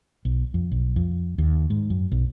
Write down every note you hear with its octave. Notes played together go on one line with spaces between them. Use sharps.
B1
F2
B1
F2
D#2
G#2
F#2
B1